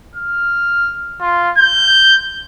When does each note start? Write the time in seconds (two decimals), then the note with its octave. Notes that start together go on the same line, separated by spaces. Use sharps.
0.16 F6
1.20 F4
1.58 G6